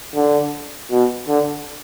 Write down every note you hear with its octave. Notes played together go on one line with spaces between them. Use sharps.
D3
B2
D3